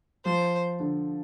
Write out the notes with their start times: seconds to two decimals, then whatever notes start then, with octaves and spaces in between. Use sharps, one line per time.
0.25 F3 C5
0.80 D3